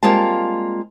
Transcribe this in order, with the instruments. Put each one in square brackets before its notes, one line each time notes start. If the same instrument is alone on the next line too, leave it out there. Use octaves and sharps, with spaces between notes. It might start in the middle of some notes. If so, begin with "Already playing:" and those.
[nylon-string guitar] G3 G#3 A#3 C4 F4 A5